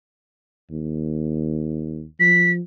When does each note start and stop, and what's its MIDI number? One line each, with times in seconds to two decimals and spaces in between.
0.71 2.04 39
2.20 2.60 53
2.20 2.51 95